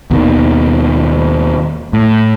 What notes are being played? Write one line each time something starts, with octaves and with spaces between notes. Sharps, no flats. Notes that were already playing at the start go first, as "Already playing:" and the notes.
D#2 B2 D#3
A2